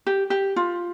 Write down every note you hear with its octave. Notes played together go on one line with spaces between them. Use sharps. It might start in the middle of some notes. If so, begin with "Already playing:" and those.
G4
G4
F4